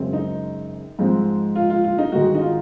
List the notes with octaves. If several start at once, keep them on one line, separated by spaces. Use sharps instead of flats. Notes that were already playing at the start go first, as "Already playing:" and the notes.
Already playing: F#2 C#3 G#3 C4
D#4
G#2 F3 G#3 C4
F4
F4
F4
D#4
G#2 D#3 G#3 F#4
D#4
F4